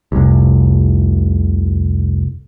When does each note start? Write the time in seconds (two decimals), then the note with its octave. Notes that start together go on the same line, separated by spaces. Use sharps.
0.12 F1 C2